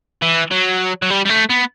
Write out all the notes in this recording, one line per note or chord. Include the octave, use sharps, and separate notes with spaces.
E3
F#3
F#3
G3
G3
A3
B3